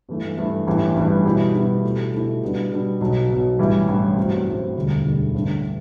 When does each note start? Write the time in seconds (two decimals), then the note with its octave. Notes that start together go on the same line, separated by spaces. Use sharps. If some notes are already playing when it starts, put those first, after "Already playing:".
0.09 G2 E3 A3
0.37 G2 E3 A3
0.67 A1 G2 E3 G3
0.96 A1 G2 E3 G3
1.25 B2 G3 B3 E4 G4
1.55 B2 G3 B3 E4 G4
1.83 B2 A3 E4 G4
2.13 B2 A3 E4 G4
2.42 B2 G3 B3 D4
2.72 B2 G3 B3 D4
3.01 B1 B2 F#3
3.30 B1 B2 F#3
3.59 A1 G2 E3 G3
3.88 A1 G2 E3 G3
4.17 A1 G2 F#3 C4
4.47 A1 G2 F#3 C4
4.76 E1 D2 D3 G3
5.06 E1 D2 D3 G3
5.34 A1 G2 D3